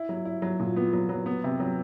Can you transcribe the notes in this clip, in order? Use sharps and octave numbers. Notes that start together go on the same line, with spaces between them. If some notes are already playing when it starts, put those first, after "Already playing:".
Already playing: E4
F#3
E4
F#3
A#2
B3
F#3
F#3
B3
C3
F#3